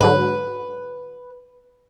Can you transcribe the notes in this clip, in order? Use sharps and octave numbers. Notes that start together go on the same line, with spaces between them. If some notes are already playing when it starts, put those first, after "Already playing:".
G#2 D3 F#3 B4